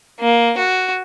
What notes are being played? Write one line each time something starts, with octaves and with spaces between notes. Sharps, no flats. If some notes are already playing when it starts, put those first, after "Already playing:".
A#3
F#4